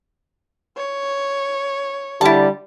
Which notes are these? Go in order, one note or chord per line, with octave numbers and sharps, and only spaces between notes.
C#5
D3 G3 E4 A5